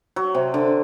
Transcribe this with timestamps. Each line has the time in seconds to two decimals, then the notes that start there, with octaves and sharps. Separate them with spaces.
0.16 F#3
0.35 C3
0.54 D3